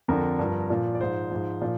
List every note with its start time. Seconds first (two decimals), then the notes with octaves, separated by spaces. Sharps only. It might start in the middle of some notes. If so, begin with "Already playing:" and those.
0.08 F2 D3 F3 A#4
0.39 G2 F3
0.70 A#2 F3
0.95 D5
1.00 G#2 F3 C5
1.31 G#2 F3
1.61 A#2 F3